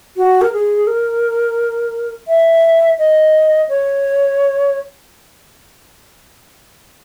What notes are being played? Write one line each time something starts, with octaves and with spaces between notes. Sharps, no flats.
F#4
A#4
G#4
A#4
E5
D#5
C#5